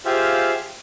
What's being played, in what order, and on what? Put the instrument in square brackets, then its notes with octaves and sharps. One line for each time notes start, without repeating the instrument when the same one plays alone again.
[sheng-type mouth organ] F4 G4 G#4 C5 E5 F5